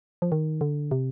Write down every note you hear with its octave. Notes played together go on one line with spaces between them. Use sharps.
F3
D#3
D3
C3